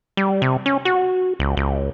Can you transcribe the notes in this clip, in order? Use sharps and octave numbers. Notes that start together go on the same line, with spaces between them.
G3
C3
C#4
F#4
C#2
C#2